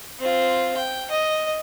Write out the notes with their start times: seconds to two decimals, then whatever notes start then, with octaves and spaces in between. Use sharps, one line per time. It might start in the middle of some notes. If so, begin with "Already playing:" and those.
0.20 C4 F4
0.77 G5
1.11 D#5